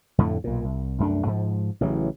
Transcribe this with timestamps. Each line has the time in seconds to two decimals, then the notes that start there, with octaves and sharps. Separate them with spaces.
0.18 F2 A2 D3 A3
0.44 B1 A#2
0.65 C2
0.98 C2 F#2 A3 D4
1.27 G#2 F3
1.81 A1 C#3 E3 F#3